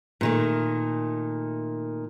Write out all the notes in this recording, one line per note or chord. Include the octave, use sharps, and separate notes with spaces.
A#2 D#3 A3